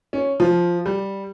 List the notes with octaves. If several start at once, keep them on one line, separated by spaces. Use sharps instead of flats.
C#4
F3
G3